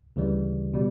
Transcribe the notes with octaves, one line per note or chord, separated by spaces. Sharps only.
D2 C#3 E3 G3
B2 G3